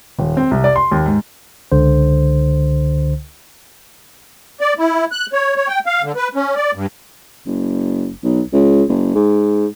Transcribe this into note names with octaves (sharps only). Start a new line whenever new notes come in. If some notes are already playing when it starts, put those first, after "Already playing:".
D#1
C4
C2
D5
C6
D#2
G#2
C#2 D3 C5
D5
E4
F#6
C#5
C#5
G5
F5
D3
B4
C#4
D5
G2
F#1
B1
C#2
F#1
G#2